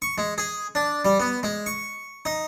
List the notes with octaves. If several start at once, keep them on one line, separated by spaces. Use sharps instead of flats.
C#6
G#3
G#4
D4
G3
B3
G#3
C#6
D#4